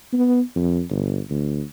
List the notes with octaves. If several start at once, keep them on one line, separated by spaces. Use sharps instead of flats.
B3
F2
G1
D2